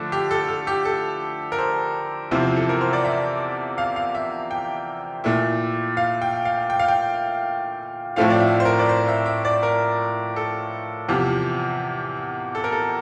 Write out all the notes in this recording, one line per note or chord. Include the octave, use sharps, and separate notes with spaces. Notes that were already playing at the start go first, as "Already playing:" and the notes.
Already playing: D3 F3 A3 D4
G4
A4
A4
G4
A4
A#4
C5
E2 C3 F3 C4 E4
A4
A#4
C5
D5
E5
F5
F5
E5
G5
A#2 A3 E4
F5
G5
F5
G5
F5
G5
A2 F3 A3 C4 F4 F5
D5
E5
C5
A#4
D5
C5
E5
E5
D5
A#4
A4
E2 C3 F3 G4
A4
A#4
A4